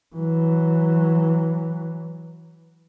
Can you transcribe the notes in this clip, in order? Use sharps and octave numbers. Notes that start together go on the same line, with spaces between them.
E3 F#3